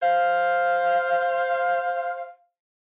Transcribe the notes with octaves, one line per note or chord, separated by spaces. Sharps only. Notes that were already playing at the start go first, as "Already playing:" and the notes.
C5 F5